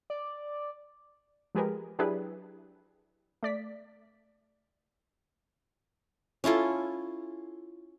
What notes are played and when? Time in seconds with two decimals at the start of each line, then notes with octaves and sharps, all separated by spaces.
0.10 D5
1.55 F3 G#3 G4 G#4 A#4 B4
1.99 F#3 D4 E4 G4 G#4 B4
3.43 A3 D5 B6
6.44 C#4 E4 F4 A4